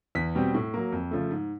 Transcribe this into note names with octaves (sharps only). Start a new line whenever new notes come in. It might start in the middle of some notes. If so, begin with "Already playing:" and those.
E2 B6
B2 G3 C4
A2
F#3 A#3
F2
C#3 F3 A3
G#2